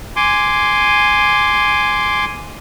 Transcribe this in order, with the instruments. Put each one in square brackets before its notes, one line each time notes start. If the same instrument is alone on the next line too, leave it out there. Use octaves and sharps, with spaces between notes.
[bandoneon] G#5 C6 D6